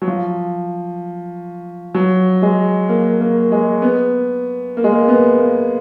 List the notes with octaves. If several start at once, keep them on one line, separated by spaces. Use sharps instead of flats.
F#3
F3
F#3
G#3
A#3
A#3
G#3
B3
A#3
G#3
A#3
B3
A#3